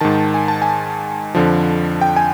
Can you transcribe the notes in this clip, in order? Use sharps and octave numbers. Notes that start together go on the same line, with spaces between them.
G#2 D#3 A5
G#5
A5
G#5
F2 D3 F3
G5
G#5